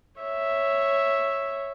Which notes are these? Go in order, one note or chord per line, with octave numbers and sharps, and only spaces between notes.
C#5 E5